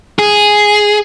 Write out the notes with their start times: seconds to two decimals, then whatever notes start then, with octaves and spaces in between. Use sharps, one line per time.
0.19 G#4